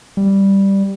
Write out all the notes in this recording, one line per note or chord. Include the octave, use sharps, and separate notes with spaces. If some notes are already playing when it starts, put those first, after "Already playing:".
G3